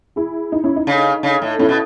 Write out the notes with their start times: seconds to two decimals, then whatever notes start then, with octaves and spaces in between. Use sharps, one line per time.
0.16 E4 G#4
0.52 D#4
0.64 C#4 E4
0.76 D#4
0.87 C#3
1.23 C#3
1.42 A2
1.59 A2 C#4 E4
1.69 B2